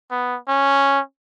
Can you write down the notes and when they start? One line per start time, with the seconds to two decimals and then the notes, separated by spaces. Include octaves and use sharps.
0.11 B3
0.48 C#4